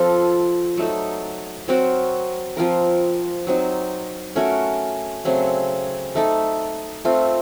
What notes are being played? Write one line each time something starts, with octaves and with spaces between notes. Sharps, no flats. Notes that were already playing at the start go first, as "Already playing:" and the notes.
Already playing: F3 C4 F4 A4
F#3 A3 D#4 A4
F#3 C4 F#4 A#4
F3 C4 F4 A#4
F#3 C4 D#4
A3 C#4 F#4 A#4
C#3 F#3 A3 C4
A3 D#4 A4
A3 C4 F4